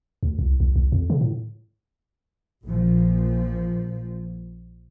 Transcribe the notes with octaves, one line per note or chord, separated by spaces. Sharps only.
D2
C2
C2
C2
F2
C#3
A2
A#1 A#2 F3